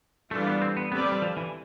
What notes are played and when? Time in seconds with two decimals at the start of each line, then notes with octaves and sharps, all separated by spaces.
0.31 E3 G3 A3 D4 F4 A4
0.47 B3
0.62 C4
0.77 B3
0.92 A3 B3 C4 G4 B4 D5
1.01 G3
1.12 G3
1.22 F3
1.37 E3